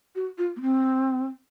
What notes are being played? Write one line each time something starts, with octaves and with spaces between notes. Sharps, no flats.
F#4
F4
A#3
C4